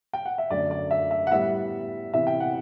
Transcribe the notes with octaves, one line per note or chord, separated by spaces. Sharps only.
G5
F#5
E5
F#2 D3 A3 D5
D5
E5
E5
F#5
A2 G3 B3 E5
C3 E3 B3 E5
G5
F#5